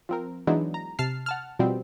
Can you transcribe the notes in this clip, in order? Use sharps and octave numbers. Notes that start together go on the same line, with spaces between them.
F3 C4 A#4
E3 F#3 G#3 B3 D4 D#4
A#5
C3 A5 F6 C7
F#5 A5 F6
B2 F3 G3 B3 C4